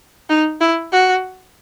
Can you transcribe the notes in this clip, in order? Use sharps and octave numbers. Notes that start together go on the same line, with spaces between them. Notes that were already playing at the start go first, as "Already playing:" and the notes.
D#4
E4
F#4